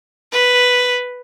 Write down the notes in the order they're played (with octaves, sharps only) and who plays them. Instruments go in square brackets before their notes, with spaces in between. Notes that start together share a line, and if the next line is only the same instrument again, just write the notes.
[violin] B4